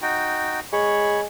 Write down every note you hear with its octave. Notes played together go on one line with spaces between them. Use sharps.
D#4 F#4 G5
G#3 C#5 B5 C#6